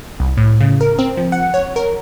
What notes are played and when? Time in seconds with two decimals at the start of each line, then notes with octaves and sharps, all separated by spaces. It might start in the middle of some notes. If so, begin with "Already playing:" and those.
0.20 C2
0.37 A2
0.61 C#3
0.81 A#4
0.99 C4
1.17 F3
1.32 F#5
1.54 C#5
1.76 A#4